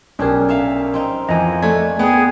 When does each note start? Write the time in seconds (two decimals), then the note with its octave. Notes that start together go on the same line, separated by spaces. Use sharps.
0.19 B1 C#4 D4 G4 G#4 A#4
0.49 A4 E5 F5
0.94 C4 D#4
1.29 F2 E3 A#3 D#5 G#5
1.62 A3 D4 G#6
1.99 B3 G#4 G5